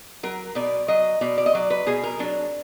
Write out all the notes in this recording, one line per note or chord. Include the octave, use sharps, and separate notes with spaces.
F#3 A#4
B2 D5
F#3 D#5
B2 D5
D5
D#5
F#3 D5
B4
B2 G#4
A#4
F#3 D4